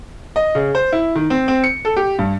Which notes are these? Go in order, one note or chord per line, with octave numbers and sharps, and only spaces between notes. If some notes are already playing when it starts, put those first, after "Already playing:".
D#5
C#3
C5
E4
D#3
C4
C4
C#7
A4
G4
G2